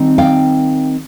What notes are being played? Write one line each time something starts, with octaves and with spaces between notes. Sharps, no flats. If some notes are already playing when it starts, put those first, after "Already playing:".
Already playing: D#3 G3 C4 D#4
F5 G5